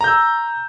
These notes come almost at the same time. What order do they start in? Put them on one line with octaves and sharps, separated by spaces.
A#5 G6 E6